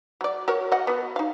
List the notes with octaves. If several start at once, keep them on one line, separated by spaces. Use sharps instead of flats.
F#3 D5
F#4 A#4 C#5
D#5 F#5
B3 F#4
D#4 F5